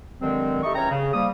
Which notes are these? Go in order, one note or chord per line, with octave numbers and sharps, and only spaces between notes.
G2 D3 D#3 F#3 G#3 C4
D#4 E4 G4 A4 D#5 C#6
C#2 E3 C#4 C#5 G5 A#5
C#3
F3 G3 A#3 D#6